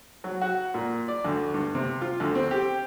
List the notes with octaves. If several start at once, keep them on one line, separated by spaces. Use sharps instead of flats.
F#3
F#4
A#2
D5
D2
G2
C3
F4
D2
C4
G4